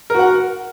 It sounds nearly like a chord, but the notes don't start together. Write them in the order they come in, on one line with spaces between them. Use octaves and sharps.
A#4 F#4 F#5